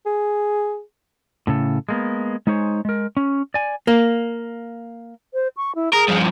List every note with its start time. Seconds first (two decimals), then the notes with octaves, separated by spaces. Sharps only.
0.06 G#4
1.47 A2 C#3 A4
1.89 G#3 A#3 B3
2.47 G#3 D#4 G#4 C5 C#5
2.85 G#3 A#4
3.17 C#4
3.54 D5 G#5
3.87 A#3
5.34 C5
5.57 C#6
5.75 E4
5.93 G#4 A#4
6.08 G2 F3